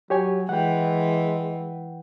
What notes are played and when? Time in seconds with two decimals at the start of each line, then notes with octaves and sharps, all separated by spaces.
0.10 F#3 G4 C#5 G#5
0.49 E3 G#3 F#5 G5